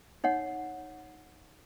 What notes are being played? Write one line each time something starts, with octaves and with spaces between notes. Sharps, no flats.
D#4 C#5 F#5